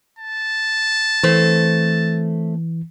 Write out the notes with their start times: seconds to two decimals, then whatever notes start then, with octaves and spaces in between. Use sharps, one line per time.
0.19 A5
1.24 E3 A3 C4